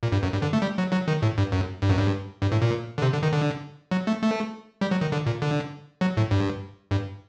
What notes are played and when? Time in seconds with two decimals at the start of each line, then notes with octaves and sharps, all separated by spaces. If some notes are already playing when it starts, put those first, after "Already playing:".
0.03 A#2
0.12 G2
0.23 F#2
0.32 G2
0.42 D3
0.53 A3
0.62 G3
0.78 F#3
0.92 F#3
1.08 D#3
1.22 A2
1.38 G2
1.52 F#2
1.82 G2
1.90 F#2
1.98 G2
2.42 G2
2.52 A2
2.62 A#2
2.98 D3
3.02 C3
3.13 D3
3.23 D#3
3.33 D3
3.91 F#3
4.07 A3
4.22 A3
4.81 G3
4.91 F#3
5.01 D#3
5.12 D3
5.26 A#2
5.42 D3
6.01 F#3
6.17 A2
6.31 G2
6.91 G2